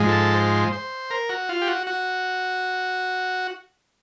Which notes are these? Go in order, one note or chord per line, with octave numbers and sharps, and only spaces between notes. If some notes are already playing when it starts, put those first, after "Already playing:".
Already playing: G#2 F3 G#3
A4
C5
C5
A#4
F#4
F4
G4
F#4
F#4